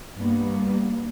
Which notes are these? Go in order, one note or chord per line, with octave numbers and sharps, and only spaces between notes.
G2 A#3 B3